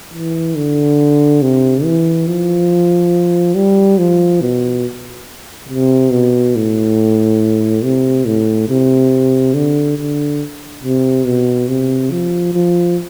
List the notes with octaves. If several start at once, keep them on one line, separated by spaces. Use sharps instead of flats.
E3
D3
C3
E3
F3
G3
F3
B2
C3
B2
A2
C3
A2
C3
D3
D3
C3
B2
C3
F3
F3